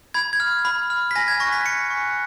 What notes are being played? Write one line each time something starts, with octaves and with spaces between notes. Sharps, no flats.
B5 G#6
G#6
F6
B5
F6
B6
G#5 A#6
G#6
C#6 F#6 A#6
B6
G#5 C#7
C#6
F#6